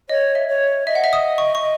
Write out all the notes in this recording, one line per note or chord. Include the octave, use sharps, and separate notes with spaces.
C#5 D#5
E5
C#5
D#5 E5
F#5
E5
D#6
C#6
C#6